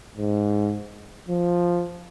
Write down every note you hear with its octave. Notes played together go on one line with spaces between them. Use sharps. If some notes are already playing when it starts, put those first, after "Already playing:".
G#2
F3